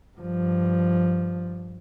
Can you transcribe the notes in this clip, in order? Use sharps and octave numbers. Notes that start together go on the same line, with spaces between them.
G2 F3